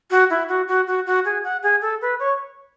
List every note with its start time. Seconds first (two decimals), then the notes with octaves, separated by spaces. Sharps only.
0.11 F#4
0.30 E4
0.49 F#4
0.68 F#4
0.87 F#4
1.06 F#4
1.25 G#4
1.44 F#5
1.63 G#4
1.82 A4
2.02 B4
2.20 C#5